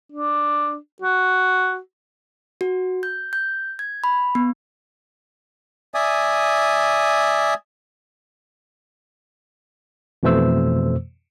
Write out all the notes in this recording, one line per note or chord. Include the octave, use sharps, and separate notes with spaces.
D4
F#4
F#4
G6
G6
G#6
B5
B3
D5 E5 G#5 D#6
F2 B2 E3 A3 C5 E6